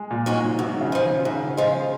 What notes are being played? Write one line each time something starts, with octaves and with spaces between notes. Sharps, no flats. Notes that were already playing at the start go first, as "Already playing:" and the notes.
Already playing: G#3
A#2
G#2 G#3 C#4 F#4
G#2
F#2 B2
D#3
C#3
F3 G#3
D#3
F#2 C#3
F3 G#3